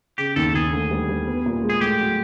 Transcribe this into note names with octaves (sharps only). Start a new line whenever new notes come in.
C#3 G4
D#2 A4
D#2 G#4
D2
G3
G3
B3
A#2
G#3
G#4
A2 G4
F#3